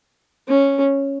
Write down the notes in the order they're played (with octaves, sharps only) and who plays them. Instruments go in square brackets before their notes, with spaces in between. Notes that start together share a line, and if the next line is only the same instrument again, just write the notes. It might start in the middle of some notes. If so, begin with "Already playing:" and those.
[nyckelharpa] C#4